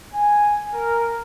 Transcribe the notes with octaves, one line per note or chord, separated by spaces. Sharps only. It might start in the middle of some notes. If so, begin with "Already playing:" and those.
G#5
A#4